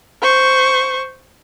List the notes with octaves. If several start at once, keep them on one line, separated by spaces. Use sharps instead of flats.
C5 C#6